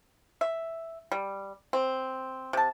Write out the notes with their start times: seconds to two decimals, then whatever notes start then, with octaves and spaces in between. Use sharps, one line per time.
0.41 E5
1.12 G3
1.73 C4
2.53 C3 A5